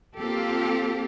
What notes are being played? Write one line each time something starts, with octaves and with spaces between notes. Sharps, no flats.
A#3 C4 F4 G4 A4